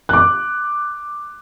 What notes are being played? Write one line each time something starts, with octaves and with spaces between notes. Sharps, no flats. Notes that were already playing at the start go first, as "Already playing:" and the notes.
D6 F#6